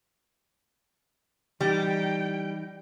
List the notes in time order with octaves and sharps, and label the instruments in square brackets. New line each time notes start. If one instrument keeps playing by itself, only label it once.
[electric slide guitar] E3 D#4 [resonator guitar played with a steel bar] G3 [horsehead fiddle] G5